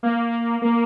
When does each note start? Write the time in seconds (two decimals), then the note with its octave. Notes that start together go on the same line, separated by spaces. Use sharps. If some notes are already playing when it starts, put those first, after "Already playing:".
0.03 A#3
0.62 A#3